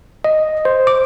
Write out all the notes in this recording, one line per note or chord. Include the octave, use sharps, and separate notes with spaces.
D#5
C5
D6